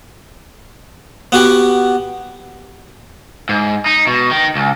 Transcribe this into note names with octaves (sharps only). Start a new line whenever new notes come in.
B3 F#4 G4
G#2
D#4
B2
D#3
C#2